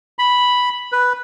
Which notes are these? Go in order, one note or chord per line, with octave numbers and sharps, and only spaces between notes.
B5
B4